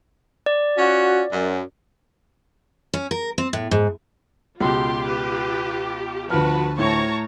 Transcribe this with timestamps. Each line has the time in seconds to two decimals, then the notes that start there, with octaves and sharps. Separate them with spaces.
0.46 D5
0.78 C#4 F4 F#4
1.32 F#2
2.94 C#4
3.11 A#4
3.38 C4
3.53 A2
3.71 G#2
4.61 C#2 B2 F4 G4 C6
5.07 B4
6.30 D2 F3 F#4 B4 A5 F6
6.79 A2 C#5 A5 A#5 C#6